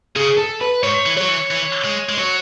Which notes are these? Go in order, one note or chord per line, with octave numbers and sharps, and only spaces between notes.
C#3 G#4
A4
B4
G#2 C#5
E3
F#3 C#5
E3
E3
G#3
G#3
F#3 C#5